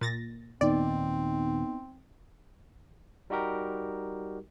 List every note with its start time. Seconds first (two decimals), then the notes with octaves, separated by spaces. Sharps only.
0.01 A#2 A6 A#6
0.61 D#2 A#2 D#3 B3 C4 D#4 D5
3.30 G3 D#4 F#4 G4 A#4